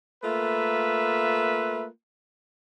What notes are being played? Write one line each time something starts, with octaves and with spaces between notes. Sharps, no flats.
A3 A#3 F4 B4 E5